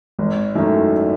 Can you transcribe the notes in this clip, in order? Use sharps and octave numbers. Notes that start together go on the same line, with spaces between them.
G#1
F#2 D#3 A3 E4